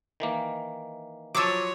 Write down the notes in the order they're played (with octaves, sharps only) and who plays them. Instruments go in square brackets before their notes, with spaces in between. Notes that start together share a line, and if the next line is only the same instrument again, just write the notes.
[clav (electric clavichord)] D#3 E3 A#3
[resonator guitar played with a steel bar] F3 F#3 [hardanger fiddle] C#5 [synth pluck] D6 E6